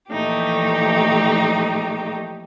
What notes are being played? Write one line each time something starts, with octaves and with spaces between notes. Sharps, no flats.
A#2 E3 F3 A3 D#4 G4